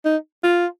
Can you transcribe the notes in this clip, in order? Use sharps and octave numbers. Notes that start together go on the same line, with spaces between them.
D#4
F4